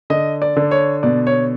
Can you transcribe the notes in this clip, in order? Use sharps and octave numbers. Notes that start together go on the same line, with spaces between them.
D3 D#5
D5
D3
C#5
B2 D5
C#5